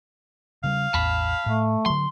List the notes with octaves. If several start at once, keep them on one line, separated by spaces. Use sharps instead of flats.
C#3 G3 F5
A1 E2 A5 B5
A2 A3
D3 F#3 C6